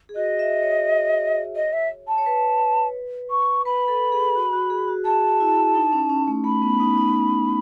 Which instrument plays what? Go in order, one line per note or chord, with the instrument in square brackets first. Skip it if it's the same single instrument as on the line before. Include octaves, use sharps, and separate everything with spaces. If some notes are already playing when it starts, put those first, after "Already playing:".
[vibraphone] G#4
[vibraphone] F#4 [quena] D#5
[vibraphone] E5
C#5
[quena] D#5
E5
A5
[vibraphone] C#5
B4
[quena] C#6
[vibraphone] B4 [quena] B5
[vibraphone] B4
A4
G#4
F#4
F#4
G#4
F#4
[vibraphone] G#4 [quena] A5
[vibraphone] E4
D#4
C#4
C#4
A3
[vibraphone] A3 [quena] B5
[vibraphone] B3
D#4
D#4